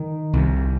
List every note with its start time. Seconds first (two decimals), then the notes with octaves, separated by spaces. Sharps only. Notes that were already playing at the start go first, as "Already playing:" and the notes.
Already playing: D#3
0.33 C2 C3